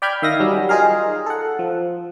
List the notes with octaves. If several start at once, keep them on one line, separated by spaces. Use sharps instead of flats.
D5 G5 B5 F6 G6 G#6
D#3 E5 F5 D#6 A#6
F#3 G3 C#4
D#4 F4 G#4 A#4 F5
A4 F#5
F3